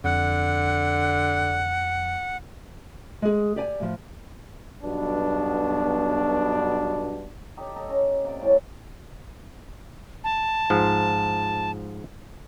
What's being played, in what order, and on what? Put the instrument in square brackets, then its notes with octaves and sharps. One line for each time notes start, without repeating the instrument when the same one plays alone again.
[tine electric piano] F2 [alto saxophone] D3 [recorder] F#5
[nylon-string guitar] G#3 G#4
G4 D5 G#5
A2 F3
[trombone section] B1 G2 B2 B3 D4
[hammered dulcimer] D#4 G4 A4
D#4 A4 A5 A#5
C#4 A#5
C3 A#3 D5 D6
A2 C#4 D#4 A5
[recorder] A5
[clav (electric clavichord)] G#2 F3